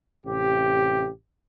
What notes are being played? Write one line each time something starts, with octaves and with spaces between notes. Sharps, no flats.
A1 C3 G4